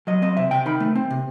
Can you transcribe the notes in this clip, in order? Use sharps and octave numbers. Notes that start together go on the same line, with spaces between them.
F#3 D#5
C4 D#5
C3 E5
C3 G5
D#3 B5
A3
C4
C3